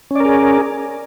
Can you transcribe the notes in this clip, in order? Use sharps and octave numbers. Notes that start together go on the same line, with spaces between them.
C#4 G#4 A#4 D5